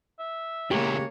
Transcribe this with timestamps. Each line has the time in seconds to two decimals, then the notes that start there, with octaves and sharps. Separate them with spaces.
0.19 E5
0.71 E2 A#2 C#3 G#3 A#3 G4 C#5